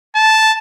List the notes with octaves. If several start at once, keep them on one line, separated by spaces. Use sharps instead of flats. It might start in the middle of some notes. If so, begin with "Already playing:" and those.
A5